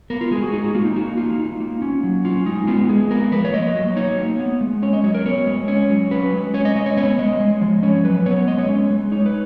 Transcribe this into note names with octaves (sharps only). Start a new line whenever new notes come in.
B3 A#4
F4
G#3 G#4
F#4
D#4 G#4
F#4
A#3 F4
D#4
D#4 F#4
A#3 F4
D#4
A#3
C#4
F#3
C#4 F4
G#3 D#4
B3 F4
G#3 G#4
B3 A#4
F3 B4
C#5
A#3 D#5
F#3
D#4 C#5
A#3
B3
G#3
C#4 C#5
D#5
F#3 C#5
A#4
B3 C#5
G#3
C#4 C#5
F#3
C#4 B4
G#3
C#4 C#5
D#5
G#3 D#5
C#5
B3 C#5
G#3 D#5
G#3
F3
C#4 C#5
F#3 B4
B3 C#5
B4
C#5
G#3 D#5
C#5
C#4
G#3
D#4 C#5
B4